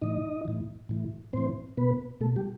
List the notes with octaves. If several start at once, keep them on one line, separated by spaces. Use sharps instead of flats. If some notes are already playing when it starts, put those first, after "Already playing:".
A2 E3 D#4 D#5
A2 E3
A2 E3
A2 E3 C4 C5
B2 B3 B4
B2 A3 A4
G3 G4